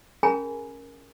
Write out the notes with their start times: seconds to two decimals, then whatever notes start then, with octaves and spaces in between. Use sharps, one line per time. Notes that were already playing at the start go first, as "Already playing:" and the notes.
0.23 C#4 G#4 A#4 G#5 A#5 B5